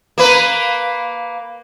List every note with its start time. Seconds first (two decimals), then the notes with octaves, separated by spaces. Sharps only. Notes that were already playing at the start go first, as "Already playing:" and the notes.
0.18 A#3 B4